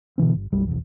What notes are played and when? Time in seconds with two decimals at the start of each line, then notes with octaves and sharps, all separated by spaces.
0.18 B2 D3 E3 C4
0.34 G1
0.52 F#1 B1 G3
0.67 F1 B1 E2